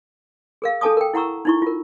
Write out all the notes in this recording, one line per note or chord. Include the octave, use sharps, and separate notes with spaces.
G#4 A#4 F5
D4 A4 G#5 A5 D6 D#6
A#4 G5
E4 F#5 A#5 C#6 E6
D#4 E4 C#6
F4 A#4